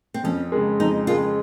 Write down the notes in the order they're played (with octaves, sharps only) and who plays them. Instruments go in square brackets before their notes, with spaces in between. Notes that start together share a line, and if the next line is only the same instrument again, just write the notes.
[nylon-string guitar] C4
[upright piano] F2 [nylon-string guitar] C#4
[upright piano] C#3 G#3
[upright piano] F2 [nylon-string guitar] D#4
[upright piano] C#3 G#3 [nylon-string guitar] F4